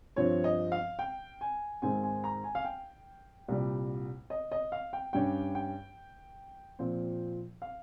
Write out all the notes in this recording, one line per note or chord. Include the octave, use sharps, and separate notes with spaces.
G2 F3 C4 C#5
D#5
F5
G5
G#5
G#2 D#3 G#3 C4 G#5
G#5
A#5
G#5
F5
G5
C2 A#2 G3
D#5
D#5
F5
G5
G2 G3 C#4 G5
G5
A#2 F3 C4
F5